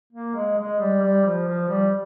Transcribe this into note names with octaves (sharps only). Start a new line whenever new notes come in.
A#3
G#3
G#3
G3
G3
F3
F3
G3